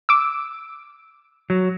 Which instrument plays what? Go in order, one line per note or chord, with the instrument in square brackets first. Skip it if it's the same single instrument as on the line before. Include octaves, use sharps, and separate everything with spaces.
[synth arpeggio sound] D6 E6
[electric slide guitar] F#3